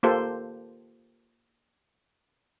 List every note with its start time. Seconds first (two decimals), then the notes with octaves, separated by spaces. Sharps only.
0.03 A#3 F4 G4 A4 C5